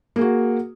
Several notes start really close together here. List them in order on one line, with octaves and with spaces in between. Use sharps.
A#3 G#4 F#4